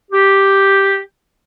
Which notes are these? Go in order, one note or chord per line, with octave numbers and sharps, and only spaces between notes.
G4